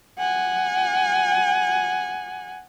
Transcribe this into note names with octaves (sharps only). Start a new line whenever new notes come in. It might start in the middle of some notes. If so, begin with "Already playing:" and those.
F#5 G#5